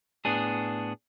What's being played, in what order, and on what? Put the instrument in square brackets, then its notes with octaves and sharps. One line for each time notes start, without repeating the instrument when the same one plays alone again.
[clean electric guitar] A2 B3 D4 G#4